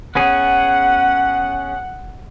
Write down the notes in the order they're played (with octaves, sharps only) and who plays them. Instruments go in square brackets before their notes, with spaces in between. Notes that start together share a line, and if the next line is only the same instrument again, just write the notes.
[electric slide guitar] B3 C#4 G#4 [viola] F#5